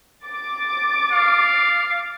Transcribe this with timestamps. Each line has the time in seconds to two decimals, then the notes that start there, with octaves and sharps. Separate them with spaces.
0.25 D6 A6
1.12 F5